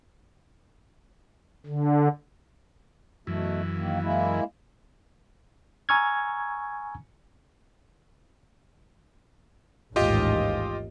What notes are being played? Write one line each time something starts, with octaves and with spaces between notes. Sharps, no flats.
D3
F#2 B2 E3 A3
D#3 A#3
G#3 A#3 E4
G#5 A#5 C#6 E6 F6 G#6
A1 D#2 G#2 F4 G4 D#5